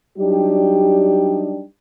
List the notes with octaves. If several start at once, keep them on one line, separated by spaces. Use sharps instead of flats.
F#3 G3 D4 D#4 G4